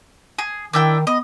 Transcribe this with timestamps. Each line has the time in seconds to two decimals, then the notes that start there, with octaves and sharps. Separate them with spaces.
0.38 G#4
0.73 D#3 D4 E4 G5
1.07 B3 D#5